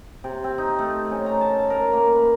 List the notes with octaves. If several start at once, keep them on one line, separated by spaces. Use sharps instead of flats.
C3
C4
D#4
A3
C#4
A#5
A5
A#4
A#3
B4